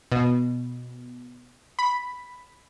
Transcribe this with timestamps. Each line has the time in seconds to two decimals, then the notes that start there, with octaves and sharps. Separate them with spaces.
0.12 B2
1.79 B5